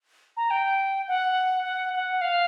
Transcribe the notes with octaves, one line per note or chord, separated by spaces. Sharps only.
A#5
G5
F#5
F#5
F#5
F5